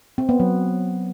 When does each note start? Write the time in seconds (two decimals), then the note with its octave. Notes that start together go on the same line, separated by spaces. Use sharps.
0.18 C4
0.29 B3
0.40 F#3